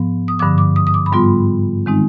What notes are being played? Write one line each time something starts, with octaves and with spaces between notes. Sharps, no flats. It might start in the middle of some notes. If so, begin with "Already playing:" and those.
Already playing: G#2 F3 B3
D#6
G2 D3 F3 D6
D6
D#6
D#6
D6
B5
G#2 G3 B3 F4 C6
D#3 G#3 C4 D#4